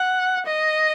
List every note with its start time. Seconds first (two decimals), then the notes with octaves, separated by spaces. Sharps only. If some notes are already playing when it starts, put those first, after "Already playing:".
Already playing: F#5
0.46 D#5